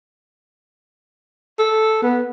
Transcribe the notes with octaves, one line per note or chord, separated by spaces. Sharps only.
A4
B3